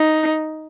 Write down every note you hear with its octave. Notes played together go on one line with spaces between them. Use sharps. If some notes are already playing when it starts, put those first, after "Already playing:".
Already playing: D#4